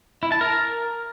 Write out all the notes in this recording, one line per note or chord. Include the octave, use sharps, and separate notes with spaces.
E4
A5
A#4